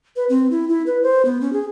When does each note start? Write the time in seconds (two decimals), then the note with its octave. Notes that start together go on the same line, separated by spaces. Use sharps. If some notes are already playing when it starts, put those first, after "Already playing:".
0.16 B4
0.29 C4
0.51 E4
0.69 E4
0.86 B4
1.03 C5
1.25 B3
1.41 C#4
1.53 G#4